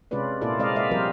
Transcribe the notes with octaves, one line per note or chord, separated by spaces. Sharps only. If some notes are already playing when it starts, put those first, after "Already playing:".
C3 G#3 C#4 F4 B4 D5
A#2 A#3 E4 F4 A4 D5
G#3 C4 A#4 D5 D#5 F5
G#3 D5 E5 F5
F3 G3 C4 F4 A#4 C5